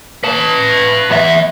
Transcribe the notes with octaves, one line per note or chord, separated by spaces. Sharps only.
B4 A5
E2 E5